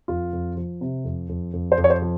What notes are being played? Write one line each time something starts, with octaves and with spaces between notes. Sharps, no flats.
F2 F4
F2
F3
C3
F2
F2
F2
C5
F2
C#5
C5
F3